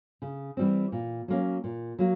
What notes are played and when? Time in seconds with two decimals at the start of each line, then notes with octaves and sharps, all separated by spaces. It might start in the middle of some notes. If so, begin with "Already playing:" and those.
0.22 C#3
0.57 E3 G3 C4
0.92 A#2
1.28 F#3 A#3 C#4
1.64 A#2
1.99 F#3 A#3